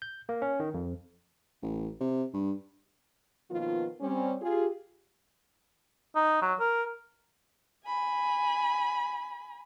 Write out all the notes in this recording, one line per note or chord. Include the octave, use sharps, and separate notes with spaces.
G6
A#3
C#4
D#3
F2
A1
C3
G2
B2 D#3 F3 A#3 B3 F4
G3 C4 C#4
F4 G4 G#4
D#4
F#3
A#4
G#5 B5